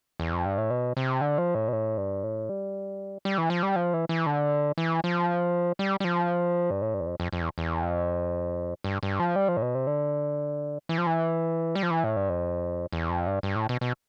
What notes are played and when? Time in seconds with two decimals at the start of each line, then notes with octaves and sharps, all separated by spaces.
0.20 E2
0.32 F2
0.46 G2
0.58 A2
0.70 B2
0.97 C3
1.21 D3
1.38 F3
1.55 A2
1.68 B2
1.73 A2
1.98 G2
2.23 A2
2.49 G3
3.25 G3
3.38 E3
3.50 F3
3.63 G3
3.76 F3
3.94 E3
4.09 E3
4.26 D3
4.78 E3
5.04 F3
5.79 G3
6.00 G3
6.04 F3
6.70 G2
6.82 A2
6.94 G2
7.00 E2
7.06 F2
7.20 F2
7.33 F2
7.41 E2
7.58 E2
7.83 F2
8.84 G2
9.03 G2
9.20 F3
9.36 G3
9.48 F3
9.57 A2
9.62 B2
9.75 C3
9.87 D3
10.89 E3
10.98 F3
11.06 E3
11.75 G3
11.83 F3
11.91 E3
12.04 A2
12.16 G2
12.29 F2
12.93 E2
13.09 F2
13.27 G2
13.43 G2
13.56 A2
13.69 B2
13.81 B2